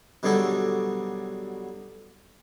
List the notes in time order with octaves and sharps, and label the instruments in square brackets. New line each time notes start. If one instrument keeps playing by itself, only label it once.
[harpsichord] B2 D3 F#3 G3 G#4 A4